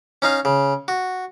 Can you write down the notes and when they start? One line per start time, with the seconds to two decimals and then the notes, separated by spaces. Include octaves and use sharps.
0.22 C#4 D#4 F5
0.45 C#3
0.88 F#4